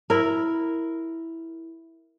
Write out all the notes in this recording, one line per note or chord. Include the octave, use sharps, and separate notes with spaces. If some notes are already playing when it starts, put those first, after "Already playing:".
E4 A#4